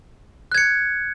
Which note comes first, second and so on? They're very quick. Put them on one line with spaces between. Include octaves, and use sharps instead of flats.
F#6 G#6 C#7